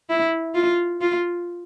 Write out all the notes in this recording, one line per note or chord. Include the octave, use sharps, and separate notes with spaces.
E4
F4
F4